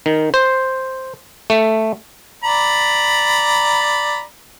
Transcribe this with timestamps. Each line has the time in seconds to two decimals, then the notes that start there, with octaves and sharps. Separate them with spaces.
0.06 D#3
0.34 C5
1.50 A3
2.44 D5 A#5 B5